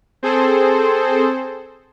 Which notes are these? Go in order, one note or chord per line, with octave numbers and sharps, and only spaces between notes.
C4 G#4 A4 C5